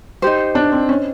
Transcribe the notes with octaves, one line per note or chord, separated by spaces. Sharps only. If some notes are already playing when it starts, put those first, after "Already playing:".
D#4 G4 C5
D4
C4
C#4